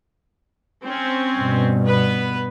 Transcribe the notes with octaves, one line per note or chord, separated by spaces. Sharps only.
C4 C#4
G2 B2
B3 B4